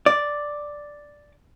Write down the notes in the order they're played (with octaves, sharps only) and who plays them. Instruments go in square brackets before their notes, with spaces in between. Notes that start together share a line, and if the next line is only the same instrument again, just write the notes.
[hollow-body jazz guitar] D5